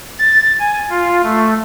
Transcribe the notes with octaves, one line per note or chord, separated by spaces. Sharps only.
A6
G#5
F4
A3